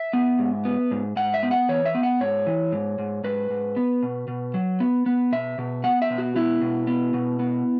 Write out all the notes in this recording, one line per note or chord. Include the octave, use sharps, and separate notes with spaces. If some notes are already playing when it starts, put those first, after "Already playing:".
Already playing: E5
B3
G#2
B3
G#2
G#2 F#5
E5
B3
F#5
E3 C#5
E5
B3
F#5
G#2 C#5
E3
G#2
G#2
G#2 B4
G#2
B3
B2
B2
F#3
B3
B3
B2 E5
B2
B3 F#5
E5
B2
F#4
B3 E4
B2
B3
B2
B3